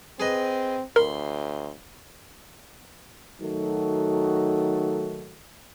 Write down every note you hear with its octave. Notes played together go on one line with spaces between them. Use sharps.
C4 G#4 B4 D#5
D2 A#4 B5 C6
D#3 F#3 A3 D#4 F#4 A4